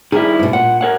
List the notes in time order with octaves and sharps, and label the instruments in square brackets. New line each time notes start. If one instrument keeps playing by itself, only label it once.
[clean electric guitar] D#3 G3 E4 [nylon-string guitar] G#4
[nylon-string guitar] G2 B2
[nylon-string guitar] A#2 [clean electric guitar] F#5
[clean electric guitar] A#4 C#5 F#5